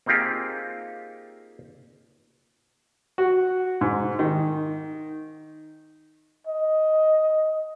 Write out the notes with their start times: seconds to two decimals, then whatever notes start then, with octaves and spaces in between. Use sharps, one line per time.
0.06 A#3 C4 D#4 F4 G4 G#4
3.18 F#4
3.81 G#2
4.19 D#3
6.47 D#5